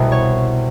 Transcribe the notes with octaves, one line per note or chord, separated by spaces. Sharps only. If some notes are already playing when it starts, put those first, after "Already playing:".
Already playing: C2 B2
C#5